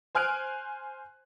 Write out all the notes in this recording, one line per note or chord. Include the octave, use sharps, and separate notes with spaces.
C5 G#5 F6 F#6 D7